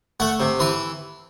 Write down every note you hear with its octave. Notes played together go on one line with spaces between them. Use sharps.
A3 F#5
C3
E3 C6